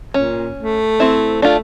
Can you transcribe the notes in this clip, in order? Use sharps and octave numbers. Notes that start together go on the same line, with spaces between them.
A#2 C#4
A3
C4 E4
A3 D4 F4